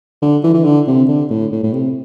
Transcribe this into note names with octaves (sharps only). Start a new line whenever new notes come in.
D3
E3
E3
D3
C3
D3
A2
A2
A2
C3